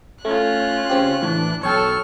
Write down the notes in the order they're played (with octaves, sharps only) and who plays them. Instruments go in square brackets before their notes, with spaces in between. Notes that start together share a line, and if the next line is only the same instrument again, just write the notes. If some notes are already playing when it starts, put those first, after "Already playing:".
[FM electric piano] A3 [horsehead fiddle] C#4 F4 [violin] F#6
[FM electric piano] C#3 C4 G4
[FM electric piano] A2 [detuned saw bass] E3 [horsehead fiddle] D4
[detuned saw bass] B1 [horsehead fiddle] A4 [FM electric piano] C#5 G5 [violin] C#6 F6